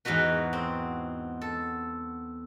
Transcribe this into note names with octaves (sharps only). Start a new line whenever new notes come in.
E2 G#2 D#4 F#4 B4
C4
A4